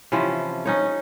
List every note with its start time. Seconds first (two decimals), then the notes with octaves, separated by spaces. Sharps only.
0.12 C3 E3 F3 C#4
0.66 C#4 D#4 C#5